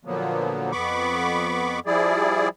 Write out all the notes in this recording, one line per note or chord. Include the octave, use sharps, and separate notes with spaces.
A#2 D3 F3 F#3 A#3 B3
F2 B3 B5 C#6 D6
F3 G3 E4 G#4 D5